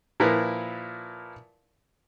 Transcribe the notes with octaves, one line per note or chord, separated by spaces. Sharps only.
A#2 F3 E4 A#4 B4